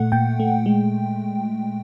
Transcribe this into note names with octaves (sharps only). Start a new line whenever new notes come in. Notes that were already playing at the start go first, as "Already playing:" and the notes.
Already playing: A#2 A3 F#5
A#2 G5
A3
G#3